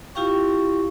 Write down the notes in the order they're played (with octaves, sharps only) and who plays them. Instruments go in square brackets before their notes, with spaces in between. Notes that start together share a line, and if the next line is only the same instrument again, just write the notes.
[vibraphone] E4 F4 G4 F5 G5 C#6